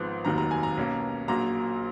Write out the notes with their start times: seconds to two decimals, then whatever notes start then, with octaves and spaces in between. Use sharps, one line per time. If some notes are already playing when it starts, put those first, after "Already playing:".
Already playing: G#1 G#2 F3 B3
0.25 F1 D#2 D#3 F#3 A#5
0.38 A#5
0.51 G#5
0.63 A#5
0.77 B1 B2 A#3 C#4
1.28 A#1 A#2 F#3 A#3 A#5